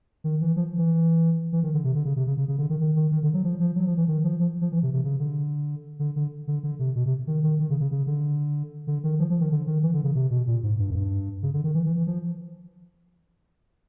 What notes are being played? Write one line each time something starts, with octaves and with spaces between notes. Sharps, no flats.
D#3
E3
F3
E3
E3
D#3
D3
C3
D3
C#3
C3
C#3
C#3
C#3
D3
D#3
D#3
D#3
D#3
D3
F#3
F3
F3
F#3
F3
E3
D#3
F3
F3
F3
E3
C3
C3
C#3
D3
D3
D3
D3
D3
C3
B2
C3
D#3
D#3
D#3
C#3
C#3
C#3
D3
D3
D#3
F3
F3
D#3
D3
D#3
E3
D3
C#3
C3
B2
A#2
G#2
G2
F#2
G2
C#3
D3
D#3
E3
E3
E3
F3